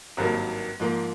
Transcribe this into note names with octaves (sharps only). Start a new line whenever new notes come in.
G#1 G2 D#3 F#3 A#3
G#2 F3 A#3